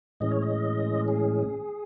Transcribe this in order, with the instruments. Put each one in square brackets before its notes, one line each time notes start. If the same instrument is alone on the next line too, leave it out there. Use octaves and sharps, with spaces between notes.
[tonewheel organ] A2 E3 G#3 C#4 D#5
C#5
D#5
G#4